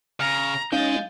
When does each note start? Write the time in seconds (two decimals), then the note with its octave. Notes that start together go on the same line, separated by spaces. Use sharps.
0.20 C#3 A#5 F6
0.72 G#3 C#4 D#4 D#5 F5 G6 A6